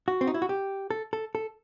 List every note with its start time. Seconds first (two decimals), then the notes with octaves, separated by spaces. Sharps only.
0.08 F#4
0.21 C4
0.27 D#4
0.34 E4
0.42 F#4
0.49 G4
0.90 A4
1.13 A4
1.35 A4